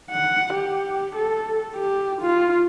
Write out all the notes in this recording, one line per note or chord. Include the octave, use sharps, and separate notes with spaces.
F#5
G4
A4
G4
F4